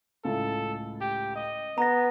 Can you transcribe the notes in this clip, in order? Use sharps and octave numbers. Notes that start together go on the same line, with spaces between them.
C#2 A2 A4
G4
D#5
B3 A#5 A#6